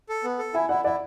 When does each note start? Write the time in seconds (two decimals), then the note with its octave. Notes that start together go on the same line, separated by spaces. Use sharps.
0.09 A4
0.24 B3
0.39 A4
0.54 E4 E5 G#5
0.69 E4 D5 F#5
0.84 E4 D5 F#5